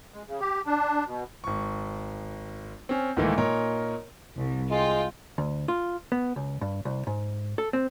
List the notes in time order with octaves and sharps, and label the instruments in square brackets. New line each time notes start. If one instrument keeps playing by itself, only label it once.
[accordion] G#3
C#3
G4
D4
B2
[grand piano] G#1 C#6
C4 C#4
C#2 A2 D#3 E3 A3 A#3
A#2 D#4 A#4 C#5
[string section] C2
[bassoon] G#3 [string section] F4 G5
[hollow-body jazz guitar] D2
F4
B3
C#2
G2
C2
G#2
A4
C4